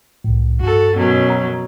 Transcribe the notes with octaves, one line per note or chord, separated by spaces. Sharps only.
C2 A2
G2 F#4 A4
F#2 B2 F#3
A#5